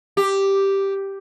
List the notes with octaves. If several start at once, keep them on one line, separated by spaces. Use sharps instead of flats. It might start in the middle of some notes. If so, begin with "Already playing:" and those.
G4